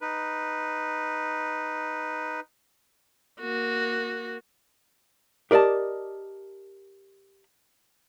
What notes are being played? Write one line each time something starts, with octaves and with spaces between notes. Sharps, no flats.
D#4 B4
A#3 F#4
G4 A#4 D5 D#5 A5